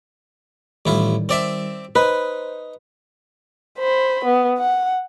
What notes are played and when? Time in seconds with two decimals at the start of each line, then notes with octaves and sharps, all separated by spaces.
0.86 A1 D#3 G3 E4 F4
1.29 C4 D5 E5
1.95 D#4 B4 C5
3.78 C5 B5
4.25 B3
4.58 F#5